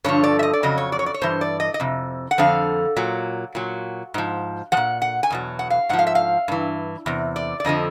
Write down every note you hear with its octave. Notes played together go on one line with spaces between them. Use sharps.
G2 D3 F3 C#5
D5
E5
D#5
D5
F2 C#3 F#3 D#5
C#5
D5
C#5
D5
C#5
G2 E3 C5
D5
D#5
D#5
F2 C3
F#5
F2 D3 F3 F5
A#2 F#3
A#2 F#3
G#2 F3
F3 F#5
A#2
F#5
G#5
E2 B2 F#3
F#5
F5
G#2 F3 F#5
F5
E5
F5
G2 E3
E2 C3
D5
D5
F2 D3 F3 D#5